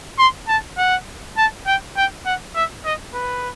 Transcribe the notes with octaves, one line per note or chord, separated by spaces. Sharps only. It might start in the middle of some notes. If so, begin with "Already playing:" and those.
C6
A5
F#5
A5
G5
G5
F#5
E5
D#5
B4